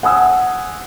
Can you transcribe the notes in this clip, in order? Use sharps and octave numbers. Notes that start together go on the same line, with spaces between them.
F#5 G#5 D#6 E6